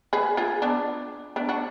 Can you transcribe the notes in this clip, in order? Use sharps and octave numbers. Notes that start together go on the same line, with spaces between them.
G#4 B4
F4 G#4
B3 D4
B3 D4
D4 F#4